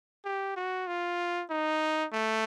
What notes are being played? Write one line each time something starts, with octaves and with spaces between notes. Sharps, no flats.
G4
F#4
F4
D#4
A3